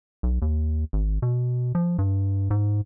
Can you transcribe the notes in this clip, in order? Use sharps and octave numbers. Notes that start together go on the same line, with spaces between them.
B1
D#2
G#1
B2
F3
G2
G#2